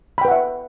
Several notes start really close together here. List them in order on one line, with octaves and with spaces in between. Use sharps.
B5 G5 B4 F#5 E5